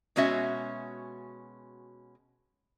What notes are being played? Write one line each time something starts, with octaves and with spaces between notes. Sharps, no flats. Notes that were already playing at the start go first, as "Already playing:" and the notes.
B2 G#3 C#4 F#4 E5